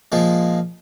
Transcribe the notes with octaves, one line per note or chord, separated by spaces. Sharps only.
A#2 F3 G#3